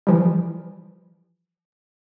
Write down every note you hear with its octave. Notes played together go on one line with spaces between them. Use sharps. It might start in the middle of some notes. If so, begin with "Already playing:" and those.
E3 F3 G3